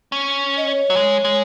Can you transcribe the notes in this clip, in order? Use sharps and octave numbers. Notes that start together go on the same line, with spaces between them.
C#4
D#5
C#5
F#3
G#3
G#3